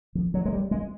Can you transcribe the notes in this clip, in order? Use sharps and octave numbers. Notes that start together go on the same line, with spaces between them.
F3
F#3
G#3
G3
G#3